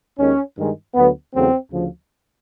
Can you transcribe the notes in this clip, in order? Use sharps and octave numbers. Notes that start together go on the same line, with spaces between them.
D#2 D#3 G#3 C#4
G2 D#3 G#3
D2 D3 F#3 B3
E2 C#3 F#3 A3 C4
D2 C#3 F3